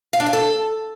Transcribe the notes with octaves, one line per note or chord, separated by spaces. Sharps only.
F5
D4
F5
A4